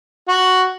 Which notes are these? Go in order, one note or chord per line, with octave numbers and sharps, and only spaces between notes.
F#4